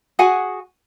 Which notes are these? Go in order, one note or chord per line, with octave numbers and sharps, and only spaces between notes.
F#4 G#4 F#5 G#5